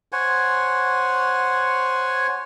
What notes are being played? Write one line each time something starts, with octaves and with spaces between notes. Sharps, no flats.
C5 C#5 F#5 G#5